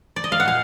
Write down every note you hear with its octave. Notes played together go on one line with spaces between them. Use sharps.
D5
D#5
F5
F#5
A#2 F5